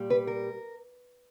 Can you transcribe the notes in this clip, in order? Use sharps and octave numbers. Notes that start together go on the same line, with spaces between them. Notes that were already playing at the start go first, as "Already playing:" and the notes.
Already playing: A#2 G3
B4
A#4